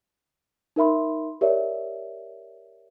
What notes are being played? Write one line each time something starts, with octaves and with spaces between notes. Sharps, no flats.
D#4 A#4 E5 B5 C6
G4 A#4 C#5 D5 E5